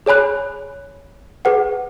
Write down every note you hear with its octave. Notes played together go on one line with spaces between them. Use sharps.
G#4 C#5 G#5 B5 F#6
G#4 B4 F#5